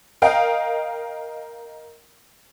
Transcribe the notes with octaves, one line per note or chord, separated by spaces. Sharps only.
A#4 D#5 F5 G5